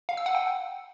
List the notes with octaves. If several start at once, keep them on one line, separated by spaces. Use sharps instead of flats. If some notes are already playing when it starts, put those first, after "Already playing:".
F5
E6
F#5
G5